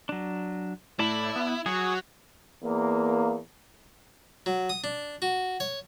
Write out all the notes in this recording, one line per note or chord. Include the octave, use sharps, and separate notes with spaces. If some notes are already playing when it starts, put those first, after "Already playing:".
F#3 D4
A2 E4 D5 A5 B5
B3
F#3 F#4 G#4
E2 A#3
F#3
D#6
D4
F#4
C#5